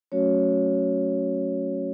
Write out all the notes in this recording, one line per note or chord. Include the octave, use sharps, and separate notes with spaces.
F#3 A3 C#4 F#4 C#5